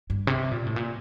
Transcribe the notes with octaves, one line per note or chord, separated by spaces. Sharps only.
G2
C3
A#2
A2
A#2